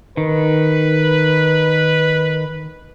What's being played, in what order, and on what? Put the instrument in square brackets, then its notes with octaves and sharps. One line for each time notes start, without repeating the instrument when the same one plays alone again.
[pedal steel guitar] D#3 [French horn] B4